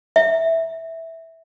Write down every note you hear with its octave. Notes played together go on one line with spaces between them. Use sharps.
E5